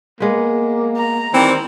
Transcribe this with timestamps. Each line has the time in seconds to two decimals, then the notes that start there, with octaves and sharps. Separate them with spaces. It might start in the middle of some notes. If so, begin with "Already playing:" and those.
0.20 G#3 A#3 B3
0.96 A#5
1.33 D#3 E3 G3 C4